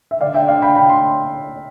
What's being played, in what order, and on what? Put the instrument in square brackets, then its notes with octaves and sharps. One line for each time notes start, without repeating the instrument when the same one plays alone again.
[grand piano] E5
[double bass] D3 [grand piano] D5 F5
[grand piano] E5 G5
D5 F5
G5 B5
G5 B5
C6